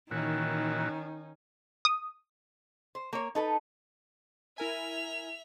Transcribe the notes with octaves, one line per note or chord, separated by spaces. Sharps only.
A#2 D#3 E3 C#4 D#4 F#4
D#6
C5
A#3 C#5
D#4 A4 B4
E4 A#4 E5 G#5 F7